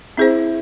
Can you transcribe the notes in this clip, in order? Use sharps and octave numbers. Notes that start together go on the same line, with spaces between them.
C4 E4 G#4 C5